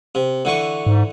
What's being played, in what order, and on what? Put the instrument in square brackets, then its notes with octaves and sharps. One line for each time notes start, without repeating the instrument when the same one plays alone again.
[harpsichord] C3
D3 E3 C#6
[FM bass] G#2